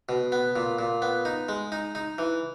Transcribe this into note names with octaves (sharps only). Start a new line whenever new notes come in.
B2
B3
A#2
A#2
B3
D#4
G#3
D#4
D#4
E3